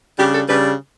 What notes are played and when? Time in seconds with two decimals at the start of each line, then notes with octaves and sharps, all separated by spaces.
0.18 C#3 G3 D4 G4
0.32 A4
0.48 C#3 G3 D4 B4